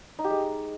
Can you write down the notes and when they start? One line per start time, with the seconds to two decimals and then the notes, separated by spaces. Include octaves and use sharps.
0.19 D#4
0.24 G4
0.30 G#3